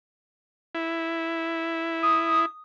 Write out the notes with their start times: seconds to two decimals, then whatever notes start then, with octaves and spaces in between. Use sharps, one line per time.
0.75 E4
2.03 D#6